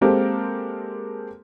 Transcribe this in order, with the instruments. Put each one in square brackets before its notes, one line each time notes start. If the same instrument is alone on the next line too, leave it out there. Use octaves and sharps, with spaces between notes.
[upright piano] G#3 A#3 C4 G4 A4 A#4